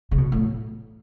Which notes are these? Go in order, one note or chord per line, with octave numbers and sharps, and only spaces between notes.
C#3
B2
A2